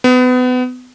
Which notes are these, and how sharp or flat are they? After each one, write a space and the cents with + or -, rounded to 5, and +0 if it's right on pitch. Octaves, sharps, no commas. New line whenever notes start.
B3 +30